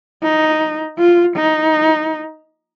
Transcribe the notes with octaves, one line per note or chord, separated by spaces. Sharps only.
D#4
F4
D#4